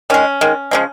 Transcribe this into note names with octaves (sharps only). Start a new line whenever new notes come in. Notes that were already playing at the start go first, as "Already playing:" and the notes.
D#3 G#3 C#4
D#3 G#3
C#3 F3 G#3